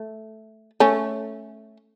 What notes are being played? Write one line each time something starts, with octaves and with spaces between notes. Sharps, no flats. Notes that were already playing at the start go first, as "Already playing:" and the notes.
Already playing: A3
A3 C#4